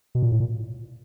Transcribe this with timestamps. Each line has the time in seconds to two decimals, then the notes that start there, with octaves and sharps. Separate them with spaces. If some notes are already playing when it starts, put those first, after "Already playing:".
0.15 B2
0.22 A#2
0.32 A2
0.40 A#2